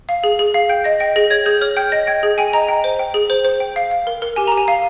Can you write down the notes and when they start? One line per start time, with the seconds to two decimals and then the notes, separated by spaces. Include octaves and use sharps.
0.09 F5
0.24 G#4
0.39 G#4
0.54 F5
0.69 G5 G6
0.84 D#5 A#6
1.00 G5 A#6
1.16 G#4 A#6
1.30 C#5 G#6
1.46 G#4 G6
1.61 C#5 F6
1.77 G5 G6
1.92 D#5 A#6
2.07 G5 G#6
2.23 G#4
2.38 G5 G#5
2.53 D#5 A#5
2.69 G5
2.84 C5
2.99 G5
3.14 G#4
3.30 C5
3.45 C5
3.60 G5
3.76 F5
3.91 F5
4.07 A#4
4.22 A#4
4.36 G4 G#5
4.47 G4 A#5
4.57 G#5
4.68 F5